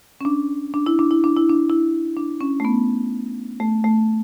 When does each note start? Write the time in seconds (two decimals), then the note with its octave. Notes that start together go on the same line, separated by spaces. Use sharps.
0.21 C#4
0.25 D4
0.74 D4
0.86 E4
0.99 D4
1.11 E4
1.24 D4
1.37 E4
1.49 D4
1.70 E4
2.17 D4
2.41 C#4
2.60 A3
2.65 B3
3.60 A3
3.84 A3